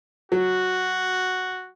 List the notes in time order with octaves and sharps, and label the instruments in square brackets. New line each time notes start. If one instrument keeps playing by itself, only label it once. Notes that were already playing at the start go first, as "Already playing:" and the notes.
[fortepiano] F#3 [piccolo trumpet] F#4